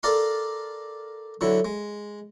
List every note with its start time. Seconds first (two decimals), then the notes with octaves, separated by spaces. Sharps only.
0.03 A4 A#4 D5 F5 C6
1.41 D3 F#3 E4
1.65 G#3